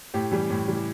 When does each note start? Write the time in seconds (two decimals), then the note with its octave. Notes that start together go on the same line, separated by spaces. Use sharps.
0.14 A2 G4
0.31 E3 G3
0.50 A2
0.68 E3 G3